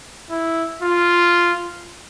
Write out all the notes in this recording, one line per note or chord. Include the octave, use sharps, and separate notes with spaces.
E4
F4